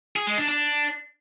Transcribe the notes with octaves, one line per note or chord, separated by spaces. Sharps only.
G#4
G#3
D4
D4